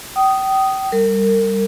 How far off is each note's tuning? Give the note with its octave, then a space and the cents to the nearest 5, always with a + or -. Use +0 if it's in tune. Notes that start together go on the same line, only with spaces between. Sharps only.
G5 -30 D#6 +0
G3 +0 A#4 -35